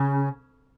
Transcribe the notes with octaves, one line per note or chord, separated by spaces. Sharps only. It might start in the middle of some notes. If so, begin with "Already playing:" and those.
Already playing: C#3